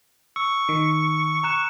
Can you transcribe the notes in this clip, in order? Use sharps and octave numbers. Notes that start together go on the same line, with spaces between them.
C#6 E6
D#3
A#5 F#6 E7